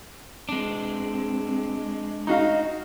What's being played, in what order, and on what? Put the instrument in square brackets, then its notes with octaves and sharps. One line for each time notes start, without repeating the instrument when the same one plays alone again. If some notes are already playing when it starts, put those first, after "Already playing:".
[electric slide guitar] G#3 D4 [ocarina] C4
[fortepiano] D#4 F#4 F5 [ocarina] D#5